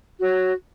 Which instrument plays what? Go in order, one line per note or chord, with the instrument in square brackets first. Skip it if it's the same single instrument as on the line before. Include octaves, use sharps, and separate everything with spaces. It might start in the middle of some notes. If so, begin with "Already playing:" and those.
[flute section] F#4 C#5